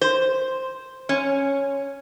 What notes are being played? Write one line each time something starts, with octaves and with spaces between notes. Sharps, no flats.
C5
C#4